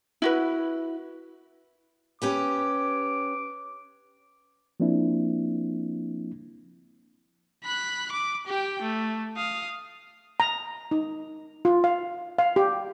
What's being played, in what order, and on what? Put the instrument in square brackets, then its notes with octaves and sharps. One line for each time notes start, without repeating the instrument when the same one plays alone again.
[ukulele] E4 F#4 B4
[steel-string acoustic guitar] C#4 G4 B4 [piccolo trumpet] D6
[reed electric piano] F3 A#3 C4 D4 E4
[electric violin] B5 F#6
D6
G4 G5
A3
F5 D#6
[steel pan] A#5
D#4
F4
F5
F5
G4